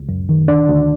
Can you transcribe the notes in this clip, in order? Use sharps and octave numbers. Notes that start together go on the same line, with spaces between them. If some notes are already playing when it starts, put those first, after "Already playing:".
Already playing: C#2
F#2
D#3
D2 D4 D5
D2